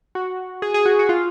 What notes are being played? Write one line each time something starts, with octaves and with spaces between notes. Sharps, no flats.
F#4
G#4
G#4
F#4
F#4
F4